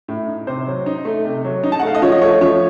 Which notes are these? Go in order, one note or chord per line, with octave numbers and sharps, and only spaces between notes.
A2
D#4
C3 C5
F#3
D#4
A3
C3
F#3
D#4
A5
F#5
A3 F5
D#5
F3 C#5
D#5
A3 C#5
F3 C#5